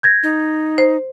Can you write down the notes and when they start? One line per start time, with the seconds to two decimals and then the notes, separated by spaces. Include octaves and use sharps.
0.03 G6 G#6 A#6
0.23 D#4
0.78 C5